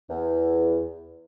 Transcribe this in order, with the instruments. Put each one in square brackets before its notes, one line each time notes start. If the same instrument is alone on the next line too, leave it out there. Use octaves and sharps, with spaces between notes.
[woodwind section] E2